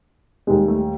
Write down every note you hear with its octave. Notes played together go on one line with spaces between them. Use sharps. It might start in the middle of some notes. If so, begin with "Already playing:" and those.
D#2 D#3 G3 G#3
A3